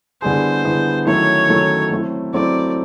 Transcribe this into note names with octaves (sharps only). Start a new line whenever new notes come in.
D3 G3 B3 E4 G#4 C5
D3 G3 B3 E4 G#4
D#3 F#3 A3 C#4 E4 C#5
D#3 F#3 A3 C#4 E4
F#3 A3 C4 E4
F#3 A3 C4 E4 D5